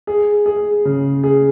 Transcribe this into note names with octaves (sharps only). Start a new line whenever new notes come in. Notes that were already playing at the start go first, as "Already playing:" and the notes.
G#4
G#4
C#3
G#4